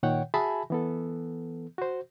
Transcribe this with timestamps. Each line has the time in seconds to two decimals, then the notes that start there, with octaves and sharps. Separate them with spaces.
0.03 A#2 D#3 C#5 F#5 G5
0.34 F#4 G#4 E5 G#5 A5 B5
0.70 E3 B3 A4
1.78 F#4 C5